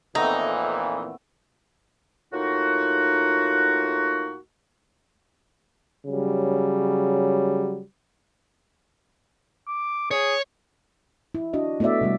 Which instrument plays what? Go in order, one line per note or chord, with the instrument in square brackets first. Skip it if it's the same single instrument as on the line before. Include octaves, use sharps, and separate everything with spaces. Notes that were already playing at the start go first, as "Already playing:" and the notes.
[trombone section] F2 A#2 E3 [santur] A3 B3 C4 [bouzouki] D#4
[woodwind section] A2 A#3 D#4 F4 F#4
[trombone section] C#3 F#3 G3
[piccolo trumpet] D6
[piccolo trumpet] G#4 [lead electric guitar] C#5
[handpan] E4
D4 F#4 D#5
A3 B3 E4 F#4 D5 E5
C3 G3 A3